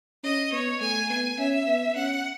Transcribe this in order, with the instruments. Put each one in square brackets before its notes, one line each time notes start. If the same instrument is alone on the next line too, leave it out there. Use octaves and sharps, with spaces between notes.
[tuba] C#4 [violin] D#5
[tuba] B3 [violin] C#5
[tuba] A3 [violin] G#5
[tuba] B3 [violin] G#5
[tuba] C#4 [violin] E5
[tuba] B3
[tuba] C#4 [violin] F#5